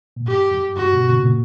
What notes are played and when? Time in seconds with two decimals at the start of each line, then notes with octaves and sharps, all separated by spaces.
0.16 A#2
0.27 G2 G4
0.51 F#2
0.76 G2 F#4
0.93 B2
1.09 A#2 C#3
1.25 A#2